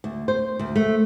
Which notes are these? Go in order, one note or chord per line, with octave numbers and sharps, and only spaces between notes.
D2
C5
D2
A3